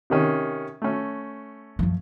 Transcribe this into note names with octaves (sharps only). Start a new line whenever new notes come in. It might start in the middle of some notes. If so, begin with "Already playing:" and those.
C3 D#3 C#4
A3 C#4
F#2 F3